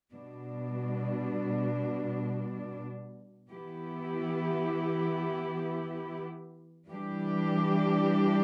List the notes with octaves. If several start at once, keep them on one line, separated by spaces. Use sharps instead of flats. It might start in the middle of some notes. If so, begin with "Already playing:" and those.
B2 G3 D4
E3 B3 E4 G4
E3 G3 D4 G4